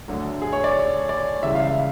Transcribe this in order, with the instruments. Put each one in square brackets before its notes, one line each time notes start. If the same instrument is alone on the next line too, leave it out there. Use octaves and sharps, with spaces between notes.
[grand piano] D2 D3 F#3
G#4
C#5
D5
D5
C#2 C#3 E3 G3 E5
F5
E5